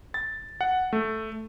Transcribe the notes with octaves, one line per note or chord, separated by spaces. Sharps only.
A6
F#5
A3